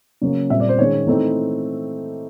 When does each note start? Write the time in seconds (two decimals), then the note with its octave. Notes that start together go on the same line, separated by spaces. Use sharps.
0.22 C#3 F#3 A#3 C#4
0.50 A#2 G3 C4 E5
0.60 D5
0.69 C5
0.78 D#3 G#3 C#4 C#5
1.07 E3 A3 C4 D#4